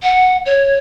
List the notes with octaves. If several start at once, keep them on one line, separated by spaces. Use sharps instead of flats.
F#5
C#5